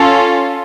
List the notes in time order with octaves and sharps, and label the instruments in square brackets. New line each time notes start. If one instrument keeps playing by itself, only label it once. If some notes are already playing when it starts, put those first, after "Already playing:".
Already playing: [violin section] C#4 F4 A4